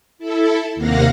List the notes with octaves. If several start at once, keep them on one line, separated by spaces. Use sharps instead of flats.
E4 A4
D#2 C3 A#3 F5 F#5 A#6